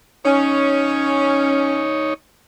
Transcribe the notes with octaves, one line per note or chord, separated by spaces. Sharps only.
C#4 D#4 C#5